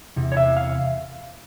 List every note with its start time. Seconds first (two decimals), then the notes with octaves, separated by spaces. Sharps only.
0.16 E2 C3
0.32 C#5
0.37 E5
0.57 F5